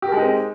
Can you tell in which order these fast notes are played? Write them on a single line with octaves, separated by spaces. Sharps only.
G4 A#4 G#3 D#4 C4